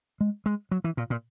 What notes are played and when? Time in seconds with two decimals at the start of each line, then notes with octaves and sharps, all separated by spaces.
0.21 G#3
0.46 G#3
0.71 F#3
0.84 E3
0.97 A#2
1.10 A#2